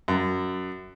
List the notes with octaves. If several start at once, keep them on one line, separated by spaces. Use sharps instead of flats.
F#2